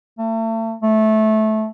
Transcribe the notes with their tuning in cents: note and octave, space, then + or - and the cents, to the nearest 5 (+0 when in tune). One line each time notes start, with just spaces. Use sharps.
A3 +35
A3 -15